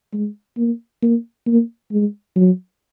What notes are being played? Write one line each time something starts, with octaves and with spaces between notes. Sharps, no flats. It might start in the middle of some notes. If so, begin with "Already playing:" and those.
G#3
A#3
A#3
A#3
G#3
F#3